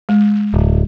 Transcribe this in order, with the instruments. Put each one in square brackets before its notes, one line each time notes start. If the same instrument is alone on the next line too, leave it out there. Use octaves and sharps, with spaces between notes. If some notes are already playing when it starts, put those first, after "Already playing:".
[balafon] G#3
[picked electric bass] D1